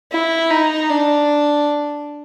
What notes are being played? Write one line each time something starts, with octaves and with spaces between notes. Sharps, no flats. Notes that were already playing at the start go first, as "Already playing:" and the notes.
E4
D#4
D4